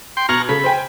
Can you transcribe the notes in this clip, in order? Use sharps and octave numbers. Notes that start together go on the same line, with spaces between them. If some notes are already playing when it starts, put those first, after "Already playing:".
G5 C6
B2 A#5 C#6 F6 G#6 F#7
C#3 A4 B5
C5 G5 G#5